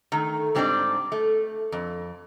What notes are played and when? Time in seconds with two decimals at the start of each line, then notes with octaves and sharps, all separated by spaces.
0.12 D#3 A3
0.55 G#2 G3 C4 D4 A4 D5
1.12 A3
1.72 F2